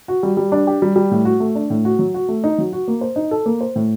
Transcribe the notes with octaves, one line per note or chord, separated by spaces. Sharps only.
F#4
G3
G3
D4
G4
G3
G3
A2
F#4
A3
D4
A2
F#4
F#3
F#4
A3
D#4
F#3
F#4
A#3
C5
D#4
A4
A#3
C5
A2